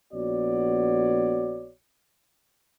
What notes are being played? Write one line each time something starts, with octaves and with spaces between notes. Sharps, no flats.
A#1 B3 F#4 C#5 D5